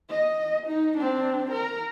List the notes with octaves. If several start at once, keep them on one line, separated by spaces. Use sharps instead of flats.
D#5
D#4
C4 D4
A#4